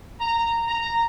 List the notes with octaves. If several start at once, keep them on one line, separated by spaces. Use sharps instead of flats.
A#5
A#5